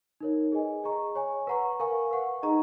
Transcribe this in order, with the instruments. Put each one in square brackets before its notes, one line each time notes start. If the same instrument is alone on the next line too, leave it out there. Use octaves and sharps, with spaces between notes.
[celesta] D#4 A#4 C#5
G#4 B4 D#5 G#5
G#4 D#5 A#5 C#6
C#5 G#5 C#6
B4 F#5 A#5 C#6
A#4 F5 G#5 C#6
B4 F#5 C#6
D#4 G#4 D#5 A#5 C#6